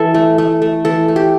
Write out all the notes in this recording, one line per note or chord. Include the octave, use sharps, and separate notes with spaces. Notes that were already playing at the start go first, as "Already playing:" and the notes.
Already playing: E3 A4
A3
A3
A3
E3 A4
A3
G4